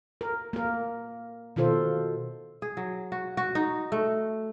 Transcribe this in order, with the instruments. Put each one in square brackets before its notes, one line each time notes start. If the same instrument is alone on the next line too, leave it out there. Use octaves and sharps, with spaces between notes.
[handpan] A#4
A#3 A#4
B2 D#3 F4 A4 C5
[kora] G#4
F#3
F#4
F#4
D#4
A3